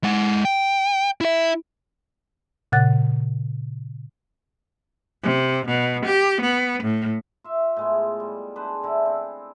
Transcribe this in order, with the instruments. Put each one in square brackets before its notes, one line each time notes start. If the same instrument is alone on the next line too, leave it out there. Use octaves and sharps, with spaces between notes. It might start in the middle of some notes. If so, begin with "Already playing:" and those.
[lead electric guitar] G#3 F#5
G5
E4 E5
[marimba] A#2 C#3 F#5 F#6 A6
[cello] C3
B2
G4
B3
A2
[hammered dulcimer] F4 E5
A2 G#3 B3
G3
D4 G#4 B4 C5
D3 E4
C4